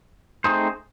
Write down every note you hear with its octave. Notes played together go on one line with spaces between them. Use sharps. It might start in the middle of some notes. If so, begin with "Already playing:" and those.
A3 C4 D#4 G#4 C5